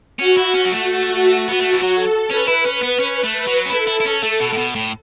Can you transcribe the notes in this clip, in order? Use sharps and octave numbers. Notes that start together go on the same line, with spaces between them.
C#4 F#4
E4
C#4
F#3
A3
B3
A3 F#4
E3
F#3
A4
C#4 B4
E4
C#4
B3
C#4 B4
A3
F#3
C#4
E4 A4
E4
E4
C#4
A3
B2
A2
B2
A2